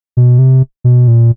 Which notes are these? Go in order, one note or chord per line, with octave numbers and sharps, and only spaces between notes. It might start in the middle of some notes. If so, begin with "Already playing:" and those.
B2
C3
B2
A#2